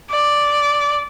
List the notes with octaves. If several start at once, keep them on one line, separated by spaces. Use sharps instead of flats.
D5